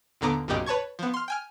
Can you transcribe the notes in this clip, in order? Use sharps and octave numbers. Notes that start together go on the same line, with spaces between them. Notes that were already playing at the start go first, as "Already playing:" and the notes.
D#2 A#2 D3 B3 A#5 D6
B1 F#2 A#2 C#3 G4 D#5
B4 C#5 A5 C#6 G#6
F3 B3
C6 F6
G5 G#5 F6